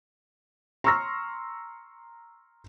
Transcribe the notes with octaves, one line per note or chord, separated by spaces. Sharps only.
A#5 C6 C#6 E6 F6 A#6